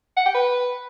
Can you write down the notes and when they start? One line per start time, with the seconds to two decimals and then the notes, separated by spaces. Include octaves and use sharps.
0.17 F#5
0.26 G5
0.34 B4